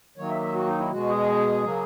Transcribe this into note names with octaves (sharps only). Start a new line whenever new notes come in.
D#3 F#3 A#3 C#5
E5
E5
F#4
D#4
E4
B2 G#3 F#4
G#4
C#3 F#3 A#3